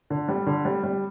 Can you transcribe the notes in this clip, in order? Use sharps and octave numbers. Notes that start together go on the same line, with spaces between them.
D3
G3
D3
G3
G3